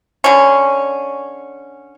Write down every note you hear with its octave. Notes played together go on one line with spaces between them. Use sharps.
D3 C#4